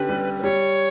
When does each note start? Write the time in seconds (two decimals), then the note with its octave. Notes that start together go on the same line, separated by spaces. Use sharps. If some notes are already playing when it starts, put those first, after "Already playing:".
Already playing: D3 C#4 G4 B4
0.09 G3
0.38 B4
0.43 G3 C#5